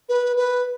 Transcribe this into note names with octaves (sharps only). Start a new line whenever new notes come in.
B4
B4